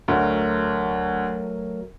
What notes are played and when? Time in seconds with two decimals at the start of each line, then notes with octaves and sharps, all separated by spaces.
0.08 D2 F#3 A3 A#4